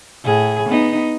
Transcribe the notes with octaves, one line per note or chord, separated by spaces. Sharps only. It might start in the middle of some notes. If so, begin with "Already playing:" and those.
A2 G#4
B3 D#4